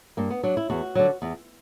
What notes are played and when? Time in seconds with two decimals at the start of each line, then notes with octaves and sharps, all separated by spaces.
0.17 G2 A#3
0.30 B3
0.43 F#3 D4
0.57 E4
0.70 E2 F#4
0.95 D3 F#3
1.22 E2